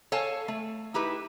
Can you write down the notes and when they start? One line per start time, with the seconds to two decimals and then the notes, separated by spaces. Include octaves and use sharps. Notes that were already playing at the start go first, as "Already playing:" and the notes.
0.12 A4 C#5 F5 G#5 A5
0.48 A3
0.94 D#4 E4 G4 B4